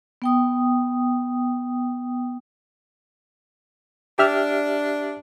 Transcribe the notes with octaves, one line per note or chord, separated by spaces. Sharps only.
B3 G5 D#6
D4 G4 E5 F6